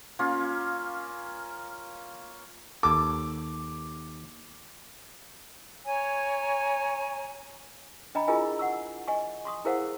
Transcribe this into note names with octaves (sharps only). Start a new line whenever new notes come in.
A#3 C#4 F4
D#2 A4 D6
C#5 G#5 A#5
D4 D#5 G5 A#5 B5
E4 F4 G#4 A#4 D#5 G#5
F#5 C#6 E6
D#5 G#5 C#6
C6 C#6 D#6
E4 G#4 A#4 C5 F5 F#5